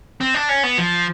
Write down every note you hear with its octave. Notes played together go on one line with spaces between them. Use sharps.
C4
D4
C#4
B3
F3